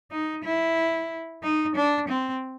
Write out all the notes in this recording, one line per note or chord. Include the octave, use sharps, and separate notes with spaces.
D#4
E4
D#4
D4
C4